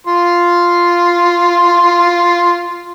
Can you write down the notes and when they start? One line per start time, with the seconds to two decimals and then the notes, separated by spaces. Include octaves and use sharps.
0.07 F4 C6